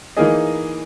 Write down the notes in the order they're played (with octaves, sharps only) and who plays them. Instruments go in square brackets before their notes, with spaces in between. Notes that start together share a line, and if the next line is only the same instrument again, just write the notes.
[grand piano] E3 A#3 D#4 G#4 D#5